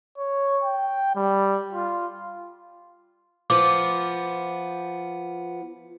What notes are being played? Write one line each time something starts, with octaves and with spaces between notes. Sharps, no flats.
C#5
G5
G3
F4
F3 B3 F4 D6